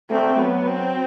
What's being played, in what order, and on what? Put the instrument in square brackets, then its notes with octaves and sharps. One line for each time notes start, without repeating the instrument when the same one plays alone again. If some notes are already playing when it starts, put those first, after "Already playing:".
[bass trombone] A3 [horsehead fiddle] C4
[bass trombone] F#3 [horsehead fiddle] B3
[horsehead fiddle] C4